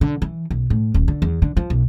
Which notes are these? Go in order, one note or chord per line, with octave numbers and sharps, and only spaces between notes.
D3
E3
B1
A2
D#1
D3
E2
D3
F3
B1